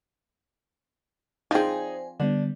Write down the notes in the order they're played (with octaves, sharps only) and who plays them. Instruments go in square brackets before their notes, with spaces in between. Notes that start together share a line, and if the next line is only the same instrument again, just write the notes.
[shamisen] F3 C4 [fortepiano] D#4 G#4 [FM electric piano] C5 D5 G#5
[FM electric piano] D3 G3 B3 [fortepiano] D4